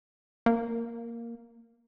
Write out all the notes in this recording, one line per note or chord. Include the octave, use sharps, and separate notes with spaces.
A#3